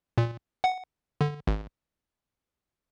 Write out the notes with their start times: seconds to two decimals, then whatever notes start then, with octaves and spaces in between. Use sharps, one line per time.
0.18 A#2
0.64 F#5
1.21 D3
1.47 G#1